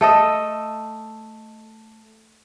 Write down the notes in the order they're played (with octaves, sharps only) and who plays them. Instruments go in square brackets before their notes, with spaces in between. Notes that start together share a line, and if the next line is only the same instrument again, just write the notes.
[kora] A3 A4 D#5